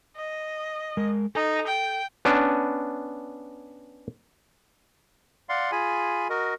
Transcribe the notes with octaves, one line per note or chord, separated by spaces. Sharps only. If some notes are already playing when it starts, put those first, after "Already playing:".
D#5
G#3 A#4
D#4 A4
G5
B3 C#4 D4
D5 F5 F#5 C6
F4 G#4 G#5 B5
F#4 A#4 D#5